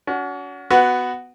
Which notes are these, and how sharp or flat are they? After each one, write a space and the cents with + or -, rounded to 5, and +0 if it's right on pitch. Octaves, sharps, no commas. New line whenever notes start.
C#4 +40 F#4 +0
B3 +10 F#4 +0